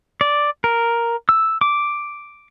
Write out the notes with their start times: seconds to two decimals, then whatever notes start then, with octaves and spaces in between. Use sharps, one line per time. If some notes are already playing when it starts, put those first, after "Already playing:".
0.21 D5
0.64 A#4
1.29 E6
1.61 D6